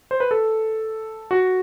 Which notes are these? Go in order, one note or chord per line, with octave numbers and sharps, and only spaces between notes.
C5
B4
A4
F#4